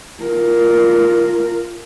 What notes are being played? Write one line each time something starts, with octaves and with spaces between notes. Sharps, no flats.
F4 A#4